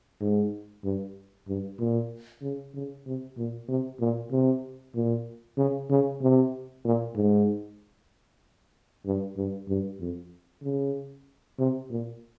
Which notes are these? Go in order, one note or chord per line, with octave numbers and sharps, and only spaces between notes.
G#2
G2
G2
A#2
C#3
C#3
C3
A#2
C3
A#2
C3
A#2
C#3
C#3
C3
A#2
G#2
G2
G2
G2
F2
C#3
C3
A#2